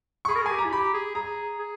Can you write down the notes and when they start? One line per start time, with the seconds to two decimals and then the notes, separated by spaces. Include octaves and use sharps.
0.25 C#6
0.28 G#4 B5
0.35 A#4
0.42 G#4
0.46 G#5
0.51 G4
0.59 A#5
0.65 E4
0.72 G4 B5
0.94 G#4
1.15 G#4 A#5
1.59 G#4